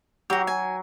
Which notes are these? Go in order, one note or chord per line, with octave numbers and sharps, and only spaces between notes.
F#3 F#4 G4
G#5